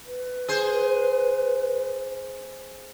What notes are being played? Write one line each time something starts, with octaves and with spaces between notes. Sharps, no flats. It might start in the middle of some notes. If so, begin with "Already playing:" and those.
B4
G#4 C5